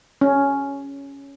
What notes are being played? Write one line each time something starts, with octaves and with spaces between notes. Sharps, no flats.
C#4